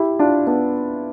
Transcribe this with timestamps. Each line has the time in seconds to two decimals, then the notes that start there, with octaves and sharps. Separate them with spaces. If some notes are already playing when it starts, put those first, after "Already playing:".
Already playing: E4 G4
0.19 D4 F4
0.47 B3 D4